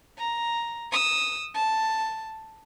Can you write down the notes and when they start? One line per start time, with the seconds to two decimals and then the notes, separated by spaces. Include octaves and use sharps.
0.18 A#5
0.91 D#6 E6
1.54 A5